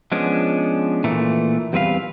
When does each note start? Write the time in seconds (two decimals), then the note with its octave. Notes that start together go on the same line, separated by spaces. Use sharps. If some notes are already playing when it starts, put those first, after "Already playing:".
0.12 F3 G#3 B3 C#4 D4
1.04 A#2 E3 A3
1.73 E2 G3 C4 B4 F5